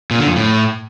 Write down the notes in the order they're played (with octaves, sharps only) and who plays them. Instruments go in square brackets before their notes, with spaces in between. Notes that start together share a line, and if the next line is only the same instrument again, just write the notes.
[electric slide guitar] A#2
D3
F2
A2